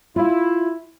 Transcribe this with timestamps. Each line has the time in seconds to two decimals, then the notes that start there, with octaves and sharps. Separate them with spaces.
0.16 E4 F4 F5